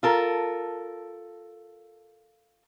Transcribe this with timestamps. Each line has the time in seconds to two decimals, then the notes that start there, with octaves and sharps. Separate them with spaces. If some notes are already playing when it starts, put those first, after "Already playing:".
0.03 F4 A4 A#4